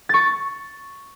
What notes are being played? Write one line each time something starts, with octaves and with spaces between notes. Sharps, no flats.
C#6 A6